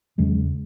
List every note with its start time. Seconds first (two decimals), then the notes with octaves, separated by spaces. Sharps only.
0.18 E2 C#3 F#3 G#3